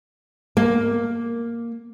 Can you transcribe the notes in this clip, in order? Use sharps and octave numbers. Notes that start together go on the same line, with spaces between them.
A#3